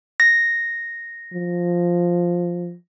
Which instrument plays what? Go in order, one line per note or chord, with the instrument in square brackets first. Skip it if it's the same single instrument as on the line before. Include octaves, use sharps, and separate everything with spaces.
[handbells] A#6
[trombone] F3